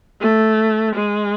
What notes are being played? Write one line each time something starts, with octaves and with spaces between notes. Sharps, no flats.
A3
G#3